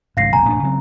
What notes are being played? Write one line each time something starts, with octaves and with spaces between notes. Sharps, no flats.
G#1 C#2 G#2 F5 A#6 C7
F1 B1 C3 G#5 A#5
E1 A2 D4
C#3 F#3 C4